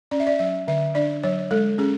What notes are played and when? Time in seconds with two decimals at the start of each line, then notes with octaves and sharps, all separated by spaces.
0.11 C#4 D5
0.20 E5
0.27 D5
0.39 F#3 E5
0.68 D3 E5
0.95 D4 D5
1.23 F#3 C#5
1.51 G#3 A4
1.78 C#4 G#4